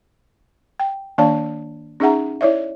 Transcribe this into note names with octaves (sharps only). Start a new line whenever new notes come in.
G5
D#3 A#3 D4 D5 F5 A5
C#4 D#4 G#4 E5 F#5 A#5
E4 C#5 D5 E5